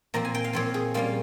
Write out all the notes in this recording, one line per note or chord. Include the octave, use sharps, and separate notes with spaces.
A#2 F3 C4 A#5
G#5
G5
F5
A#2 F3 C4 C#5
G#4
A#2 G3 A#3 C#4 F4